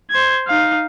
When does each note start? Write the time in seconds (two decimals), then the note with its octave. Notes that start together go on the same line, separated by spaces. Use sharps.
0.10 C5 G#6
0.47 D#4 F5